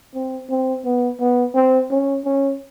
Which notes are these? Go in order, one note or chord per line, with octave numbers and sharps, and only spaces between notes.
C4
C4
B3
B3
C4
C#4
C#4